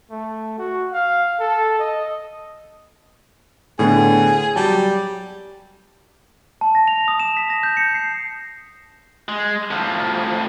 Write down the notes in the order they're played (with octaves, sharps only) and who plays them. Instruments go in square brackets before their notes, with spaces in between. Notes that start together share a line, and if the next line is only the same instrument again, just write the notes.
[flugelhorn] A3
F#4
F5
A4
D#5
[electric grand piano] A2 D3 B3 [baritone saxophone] G#4
[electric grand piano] F#3 A5 [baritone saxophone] G3
[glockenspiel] A5
A#6
F7
D#6
E7
B6
A#6
G6
C#7
C7
[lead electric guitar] G#3
A2 F3